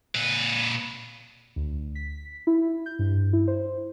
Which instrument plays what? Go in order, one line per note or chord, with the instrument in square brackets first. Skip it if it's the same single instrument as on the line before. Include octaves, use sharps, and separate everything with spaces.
[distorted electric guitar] A#2 B4
[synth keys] D2
B6
E4
G6
G2
E4
C5